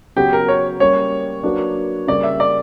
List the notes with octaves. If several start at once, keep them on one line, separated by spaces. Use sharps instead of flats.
C#3 F#3 B3 F#4 G4 B4
A#4
C#5
G3 A#3 C#4 C#5
F#3 A#3 D4 F#4 B4
C#3 G3 A#3 D5
E5
D5